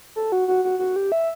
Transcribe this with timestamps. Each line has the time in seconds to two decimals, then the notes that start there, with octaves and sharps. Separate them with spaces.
0.16 A4
0.32 F#4
0.48 F#4
0.64 F#4
0.79 F#4
0.96 G4
1.12 E5